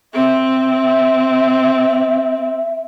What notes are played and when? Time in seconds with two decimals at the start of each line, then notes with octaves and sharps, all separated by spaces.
0.14 C4 E5